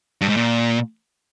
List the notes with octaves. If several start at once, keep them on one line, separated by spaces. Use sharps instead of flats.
G2
G#2
A#2